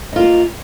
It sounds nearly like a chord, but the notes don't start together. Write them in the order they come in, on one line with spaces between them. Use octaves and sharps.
D#4 F4 A#3